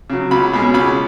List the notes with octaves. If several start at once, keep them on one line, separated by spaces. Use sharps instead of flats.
C#3 F#3
C#2 B5
B2 G#3 C#4 B5
C#2 B5